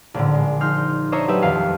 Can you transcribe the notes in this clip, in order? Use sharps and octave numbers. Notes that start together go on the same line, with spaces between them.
A#1 A2 D3
G#3
F3 D#4 C6 F6 G6
D4 C5 C#5 D#5 E5 A#5
F#3 A3 G4 B4 D#5 E5
D#1 F2 F5 C7